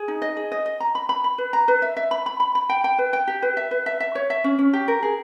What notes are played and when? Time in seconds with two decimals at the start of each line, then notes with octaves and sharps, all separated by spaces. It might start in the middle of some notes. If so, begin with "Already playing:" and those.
Already playing: G#4
0.08 D#4
0.22 D#5
0.37 G#4
0.52 D#5
0.66 D#5
0.80 A#5
0.95 B5
1.09 B5
1.24 B5
1.38 B4
1.53 A#5
1.68 B4
1.82 E5
1.97 E5
2.11 B5
2.26 B5
2.40 B5
2.55 B5
2.69 G5
2.84 G5
2.98 B4
3.13 G5
3.28 G4
3.42 B4
3.57 E5
3.71 B4
3.86 E5
4.00 E5
4.15 C#5
4.30 E5
4.44 C#4
4.58 C#4
4.73 G4
4.88 A#4
5.03 G#4